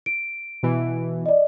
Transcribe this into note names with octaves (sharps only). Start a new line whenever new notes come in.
D7
B2 E3
D5 D#5